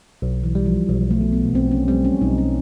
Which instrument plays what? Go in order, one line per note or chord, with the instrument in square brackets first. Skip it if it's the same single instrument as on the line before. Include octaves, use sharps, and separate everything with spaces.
[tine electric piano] B1
[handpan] E3
[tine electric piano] G3
[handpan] F3
[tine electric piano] B1 [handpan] F#3
[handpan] A3
[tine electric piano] B2
[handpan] B3
[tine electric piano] B1 [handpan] C4
[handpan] C#4
[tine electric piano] G3 [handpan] C4
[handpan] C#4
[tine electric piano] B1 [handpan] D#4
[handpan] C#4